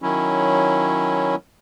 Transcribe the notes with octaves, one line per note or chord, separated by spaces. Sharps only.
D#3 F#3 C#4 E4